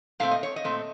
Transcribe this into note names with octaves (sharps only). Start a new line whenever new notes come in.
A#2 A3 C4 F5
D#5
C#5
D#5
A#2 A3 C4